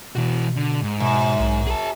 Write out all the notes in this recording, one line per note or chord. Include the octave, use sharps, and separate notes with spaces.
B2 E3 F#4
D3
G#2
F#2 B2
B1
G#4 A5